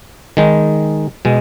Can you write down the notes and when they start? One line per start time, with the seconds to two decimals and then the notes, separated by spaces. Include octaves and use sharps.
0.37 D#3 G#3 D#4
1.25 B2 G#3